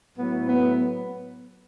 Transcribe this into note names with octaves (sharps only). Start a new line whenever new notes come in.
A2 F#3 B3
B3